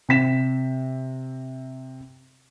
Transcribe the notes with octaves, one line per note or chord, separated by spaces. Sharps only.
C3 C4 B6 E7